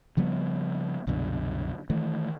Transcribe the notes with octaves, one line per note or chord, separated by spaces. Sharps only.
C#3 F3 G3 B3
C2 F#2 B2 D3
D#3 E3 A3